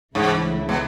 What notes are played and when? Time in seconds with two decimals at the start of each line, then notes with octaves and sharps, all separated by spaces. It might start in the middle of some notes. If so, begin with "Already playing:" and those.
0.15 C#2 G#2 C#3 E3 A3 E4
0.69 B2